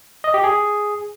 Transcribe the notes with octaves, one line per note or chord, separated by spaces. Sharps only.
D#5
G4
G#4